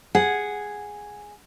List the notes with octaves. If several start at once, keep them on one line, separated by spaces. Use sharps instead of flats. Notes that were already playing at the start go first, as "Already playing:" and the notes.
G#4 F#5